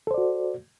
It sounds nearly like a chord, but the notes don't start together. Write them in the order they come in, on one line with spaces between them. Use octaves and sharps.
A4 C5 D5 F#4